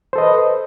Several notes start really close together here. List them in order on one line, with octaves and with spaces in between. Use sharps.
C5 A4 D#5 B4